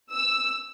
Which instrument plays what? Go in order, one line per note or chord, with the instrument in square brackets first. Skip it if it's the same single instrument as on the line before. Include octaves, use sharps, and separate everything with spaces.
[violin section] E6